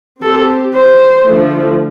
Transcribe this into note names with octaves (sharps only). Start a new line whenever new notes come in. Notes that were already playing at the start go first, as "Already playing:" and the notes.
C4 G4 A4 C5
C5
D3 F3 A3